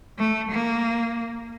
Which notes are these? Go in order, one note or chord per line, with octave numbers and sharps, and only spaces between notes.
A3
A#3